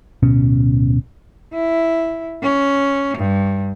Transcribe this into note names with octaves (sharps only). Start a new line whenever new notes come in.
D1 B2 C#4
E4
C#4
G2